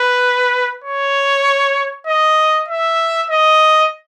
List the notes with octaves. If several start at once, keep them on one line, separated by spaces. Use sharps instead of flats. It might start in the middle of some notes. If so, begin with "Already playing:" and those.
Already playing: B4
C#5
D#5
E5
D#5